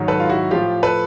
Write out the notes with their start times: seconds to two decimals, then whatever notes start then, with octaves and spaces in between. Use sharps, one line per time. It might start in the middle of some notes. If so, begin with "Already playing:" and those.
Already playing: G#2 D#3 F#3
0.08 A4 B4
0.20 F4
0.29 E4 F#4
0.51 A2 F3 F4 G4
0.83 A4 B4